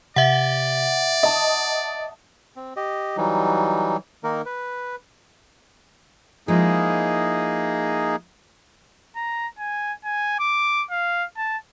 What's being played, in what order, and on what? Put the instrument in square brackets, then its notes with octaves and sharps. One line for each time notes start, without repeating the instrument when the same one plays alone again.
[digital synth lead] C3 [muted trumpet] D5 [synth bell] E5 F#5
[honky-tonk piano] D#5 A5 [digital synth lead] D#6
[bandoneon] C4
G4 D#5
E3 F#3 G3 D#4
D#3 A#3 D#4 A#4
B4
[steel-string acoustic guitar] F3 G#3 E4 [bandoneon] A#3 D#4 G#4
[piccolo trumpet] A#5
G#5
G#5
D6
F5
A5